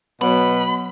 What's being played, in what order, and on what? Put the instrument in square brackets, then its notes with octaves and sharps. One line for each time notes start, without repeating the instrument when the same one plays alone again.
[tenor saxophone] B2 [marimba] F#3 F#4 C#5 [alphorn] B3 [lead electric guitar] B5